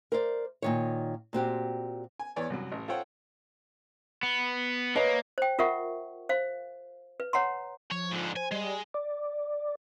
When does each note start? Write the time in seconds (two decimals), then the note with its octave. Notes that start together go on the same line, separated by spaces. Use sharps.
0.12 A#4 C5 D5
0.62 A#2 D#3 C#5
1.33 A#2 C4 F#4 G4
2.19 G#5
2.36 E2 E3 C#5 D5 G#5
2.50 C2 F#2 F#3
2.72 A1
2.88 F4 A4 C5 C#5 F#5 G5
4.23 B3
4.96 A#3 B4 C#5 D#5
5.38 C5 G5
5.59 F4 A#4 E5 F#5 C#6
6.29 C5 F5
7.20 B4
7.33 C#5 F#5 A#5 C6
7.91 F3 C#5
8.11 G#2 D3
8.36 C5 G#5
8.52 G3 G#3
8.94 D5